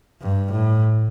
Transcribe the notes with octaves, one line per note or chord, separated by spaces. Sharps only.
G2
A2